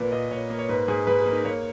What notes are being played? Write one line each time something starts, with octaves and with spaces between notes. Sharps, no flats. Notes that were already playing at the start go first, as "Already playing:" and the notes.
Already playing: A#2 A#3 B4
A#2 D#5
A#2 C#5
A#3
C#5
G#2 B4
G#2 G#4
G#2 B4
G#4
A#3
D#4
A#3 C#5